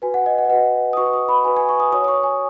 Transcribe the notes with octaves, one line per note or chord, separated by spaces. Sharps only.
F#4 B4 G#5
F#5
D#5
F#5
D#5
F#4 B4 F#5
D#6
F#4 B4 C#6
D#6
B5
F#4 B4 G#5
G#5
C#6
D#6
F#4 C#5 D#6
D#6
C#6
G#5